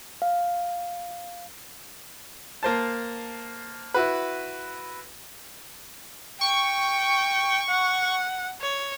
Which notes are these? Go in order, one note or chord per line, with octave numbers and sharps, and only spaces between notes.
F5
A#3 C5 A5
E4 F#4 B4
G5 C#6
F#5
C#5